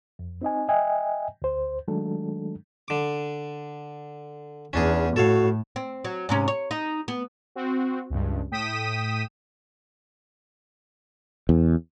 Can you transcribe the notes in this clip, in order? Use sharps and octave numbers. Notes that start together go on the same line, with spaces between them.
F2
C4 D#4 D#5 G#5
D#5 E5 G5 G#5
D2 C5
D#3 F#3 G#3 A3 D4 A4
D3 D6
E2 C#4 D4 G#4
A2 F#4 A4 C#5 F5
C4
F#3
G#2 C3 C#4
C#5
D#4
B3
C4 F#4
C#2 G2
A2 G5 D#6 B6 D#7 E7
E2